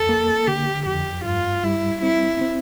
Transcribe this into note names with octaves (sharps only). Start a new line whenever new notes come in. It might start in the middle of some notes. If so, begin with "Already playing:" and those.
Already playing: F2 A4
A#3
D3 G4
F2 G4
G2 F4
G3 E4
C4 E4
C4